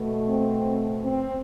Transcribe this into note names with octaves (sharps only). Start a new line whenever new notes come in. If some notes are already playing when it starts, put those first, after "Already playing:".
Already playing: B2 A3
C4
C4